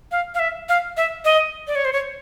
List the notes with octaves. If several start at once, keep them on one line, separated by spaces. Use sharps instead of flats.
F5
F5
E5
F5
E5
D#5
D5
C#5
C5
C#5